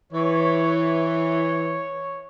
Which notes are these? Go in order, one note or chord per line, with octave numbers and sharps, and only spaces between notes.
E3 C#5